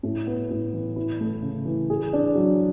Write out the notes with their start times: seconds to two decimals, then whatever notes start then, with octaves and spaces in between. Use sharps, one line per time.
0.03 A2
0.27 B3
0.50 A2
0.74 E3
0.96 E4
1.20 A3
1.42 C#3
1.65 E3
1.90 G#4
2.13 D4
2.35 F#3